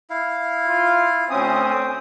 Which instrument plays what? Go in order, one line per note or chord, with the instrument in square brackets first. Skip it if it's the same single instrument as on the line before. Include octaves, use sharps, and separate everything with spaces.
[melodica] E4 F5
[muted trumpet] F4
[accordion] D2 C#4 D#6 [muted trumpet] C4